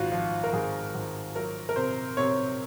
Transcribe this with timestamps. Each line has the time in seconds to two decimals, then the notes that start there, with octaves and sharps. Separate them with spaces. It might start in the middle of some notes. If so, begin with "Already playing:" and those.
Already playing: G#1 F4 F#4
0.12 F3
0.44 A#4
0.53 G#1 G#4
0.95 G#1
1.35 F#3 A#4
1.69 A#4
1.76 C3 C5
2.17 C3 C#5